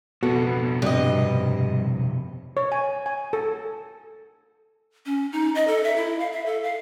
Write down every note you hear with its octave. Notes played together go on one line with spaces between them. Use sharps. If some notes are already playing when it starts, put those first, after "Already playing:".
F2 B2 B3 F#4 A4
G2 C3 D#5
C#5
G#5
G#5
A4
C#4
D#4
D#5
A4
E5
E4
F5
E5
A4
F5